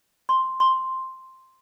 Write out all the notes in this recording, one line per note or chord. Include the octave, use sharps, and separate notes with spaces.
C6
C6